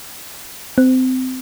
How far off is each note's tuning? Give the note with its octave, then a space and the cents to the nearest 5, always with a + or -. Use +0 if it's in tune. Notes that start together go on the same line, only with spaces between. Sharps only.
C4 -25